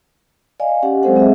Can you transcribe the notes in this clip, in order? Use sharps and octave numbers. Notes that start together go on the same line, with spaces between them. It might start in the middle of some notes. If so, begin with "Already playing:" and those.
D5 D#5 F5 G#5
C#4 G4 F#5
F#3 G#3 C4 A4 C5 F#5
G#3 C4 G#4 D#5 E5